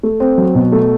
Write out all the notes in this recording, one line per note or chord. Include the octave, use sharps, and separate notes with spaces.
A3
C4
F#3
B2
A3